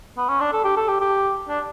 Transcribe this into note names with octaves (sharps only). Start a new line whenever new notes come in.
B3
C#4
D4
A4
G4
A4
G4
G4
D4